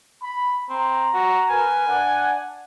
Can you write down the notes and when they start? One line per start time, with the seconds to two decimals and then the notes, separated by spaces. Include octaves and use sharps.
0.22 B5
0.69 C4 A#5
1.14 F#4
1.50 A#4 B4 G#5
1.86 D4 F#5